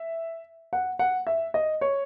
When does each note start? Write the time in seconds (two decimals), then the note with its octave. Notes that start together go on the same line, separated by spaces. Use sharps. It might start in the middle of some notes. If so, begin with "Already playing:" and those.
Already playing: E5
0.73 F#5
0.99 F#5
1.27 E5
1.54 D#5
1.81 C#5